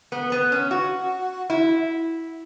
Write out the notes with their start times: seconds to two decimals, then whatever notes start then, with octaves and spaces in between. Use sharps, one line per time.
0.12 B3
0.32 B3
0.52 C#4
0.71 F#4
1.50 E4